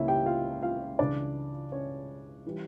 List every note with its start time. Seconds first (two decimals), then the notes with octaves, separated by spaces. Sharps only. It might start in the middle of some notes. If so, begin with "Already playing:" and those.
Already playing: C#2 C#3 E3 G3 A#3 C#4 E4 E5
0.08 G4 G5
0.26 F4 F5
0.62 F4 F5
0.99 C#2 C#3 E3 D4 D5
1.72 C#4 C#5
2.46 E3 G3